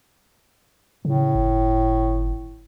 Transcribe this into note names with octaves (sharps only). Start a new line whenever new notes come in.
A2 C#3
G1